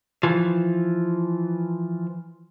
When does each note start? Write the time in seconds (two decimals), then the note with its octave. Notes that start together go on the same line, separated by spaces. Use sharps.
0.23 E3 F3